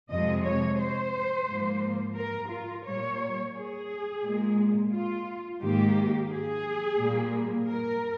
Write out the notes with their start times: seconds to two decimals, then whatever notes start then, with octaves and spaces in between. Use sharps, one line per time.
0.10 F2 C3 F3 G#3 D#5
0.45 C#5
0.79 C5
1.48 G#2 F3 A#3
2.17 A#4
2.52 F4
2.86 A#2 G3 A#3 C#5
3.55 G#4
4.23 A#2 G#3
4.92 F4
5.62 G#2 D#3 A#3 G4
6.31 G#4
6.99 A#2 G3 A#3
7.68 A#4